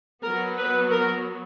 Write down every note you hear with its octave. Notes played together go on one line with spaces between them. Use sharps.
F#3 B3 A#4
B4
A#4